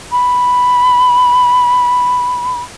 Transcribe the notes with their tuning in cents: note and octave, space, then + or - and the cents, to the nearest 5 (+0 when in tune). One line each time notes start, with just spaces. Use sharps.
B5 +0